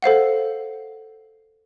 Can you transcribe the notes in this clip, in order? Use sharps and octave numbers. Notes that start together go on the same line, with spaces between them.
A4 C5 F5 F#5